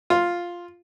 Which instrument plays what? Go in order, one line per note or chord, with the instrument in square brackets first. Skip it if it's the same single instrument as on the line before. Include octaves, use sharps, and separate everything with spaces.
[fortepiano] F4